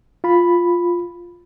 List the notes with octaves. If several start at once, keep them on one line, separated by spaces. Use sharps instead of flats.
F4 B5